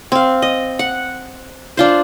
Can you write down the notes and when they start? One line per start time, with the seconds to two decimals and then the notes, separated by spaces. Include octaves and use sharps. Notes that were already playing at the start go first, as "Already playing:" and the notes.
0.12 C4 F5
0.42 D#5
0.79 F#5
1.77 D4 F4 C5